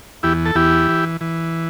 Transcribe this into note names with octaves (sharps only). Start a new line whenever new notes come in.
E2 E4 G4
A4
E2 E4 G4
E3
E3